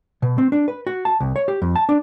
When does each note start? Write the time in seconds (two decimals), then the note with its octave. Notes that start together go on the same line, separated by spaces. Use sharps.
0.22 B2
0.38 C4
0.52 D4
0.68 B4
0.87 F#4
1.05 A5
1.20 C2
1.36 C#5
1.48 G4
1.62 F2
1.76 A5
1.89 D4